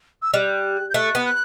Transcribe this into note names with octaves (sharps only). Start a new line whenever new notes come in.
E6
G3 F#6
G6
A3 F#6
B3
F#6